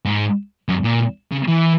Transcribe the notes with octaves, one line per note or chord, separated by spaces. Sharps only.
G#2
F#2
A#2
C#3
E3